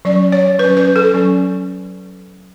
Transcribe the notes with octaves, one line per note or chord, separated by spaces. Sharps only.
F#3 C#4 D5
C#5
F#3 C#4 B4
B4
A4
F#3 C#4